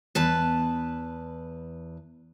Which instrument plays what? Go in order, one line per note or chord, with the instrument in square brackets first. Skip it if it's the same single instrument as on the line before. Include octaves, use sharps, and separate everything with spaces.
[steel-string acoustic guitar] E2 B4 A5